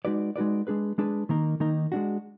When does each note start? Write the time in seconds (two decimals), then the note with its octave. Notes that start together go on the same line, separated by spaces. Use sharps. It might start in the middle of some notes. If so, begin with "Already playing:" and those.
0.05 G#3 D#4 F#4 B4 D5
0.36 G#3 D#4 F#4 B4 D5
0.67 G#3 D4 G#4 B4
0.98 G#3 D4 G#4 B4
1.29 D#3 A#3 D#4 A#4
1.60 D#3 A#3 D#4 A#4
1.92 G#3 D4 F#4